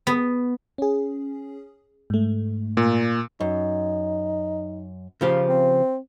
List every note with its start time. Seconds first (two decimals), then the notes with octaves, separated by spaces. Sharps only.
0.07 B3
0.78 C#4 G#4
2.10 G#2 A3
2.77 A#2
3.40 F#2 D#4
5.21 C#3 F3 G4
5.49 C4